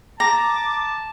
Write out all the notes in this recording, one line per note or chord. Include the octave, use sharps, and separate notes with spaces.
A5 A#5 D6